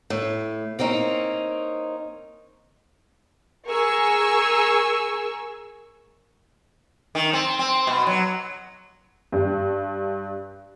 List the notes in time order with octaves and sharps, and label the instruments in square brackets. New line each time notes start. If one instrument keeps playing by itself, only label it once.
[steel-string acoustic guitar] A2
A#3 C4 C#4 D#4
[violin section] G#4 A#4 G#5 C#6 E6
[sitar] D#3
C4
C4
B2
F#3
[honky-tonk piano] G2